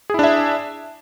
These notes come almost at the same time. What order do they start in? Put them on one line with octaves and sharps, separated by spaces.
G#4 E4 D4 E5